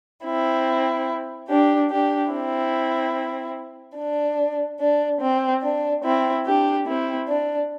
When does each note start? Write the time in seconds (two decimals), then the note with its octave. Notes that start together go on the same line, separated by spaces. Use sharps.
0.25 C4 E4
1.50 D4 G4
1.90 D4 G4
2.32 C4 E4
3.97 D4
4.80 D4
5.21 C4
5.63 D4
6.04 C4 E4
6.46 D4 G4
6.87 C4 E4
7.28 D4